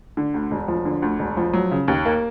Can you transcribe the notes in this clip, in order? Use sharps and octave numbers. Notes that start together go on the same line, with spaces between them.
D3
D2
E1
F3
D3
D2
E1
F3
F#3
C#3
D#2
A#3